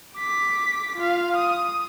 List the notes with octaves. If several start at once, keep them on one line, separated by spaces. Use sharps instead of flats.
D6 B6
F4 F5
D#6